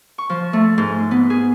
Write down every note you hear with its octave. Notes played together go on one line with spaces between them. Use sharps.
C#6
F3
A3
G#2
B3
G#4